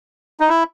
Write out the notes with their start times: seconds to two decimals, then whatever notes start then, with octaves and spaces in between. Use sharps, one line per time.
0.40 D#4
0.49 E4